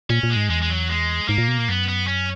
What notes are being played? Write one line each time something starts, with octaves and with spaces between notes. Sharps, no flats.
A#2 C#4
A#2
G#3
G#2
E2 G#3
G#3
F#3
G#3
G#2 A#3
A#2
B2
A#2
F#2 B3
B3
C#4